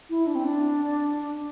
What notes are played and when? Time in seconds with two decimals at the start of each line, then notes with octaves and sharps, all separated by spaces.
0.10 E4
0.27 D4
0.35 C4
0.45 D4